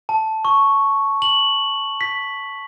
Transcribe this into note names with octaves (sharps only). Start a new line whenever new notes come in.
A5
C#6
F#7
B6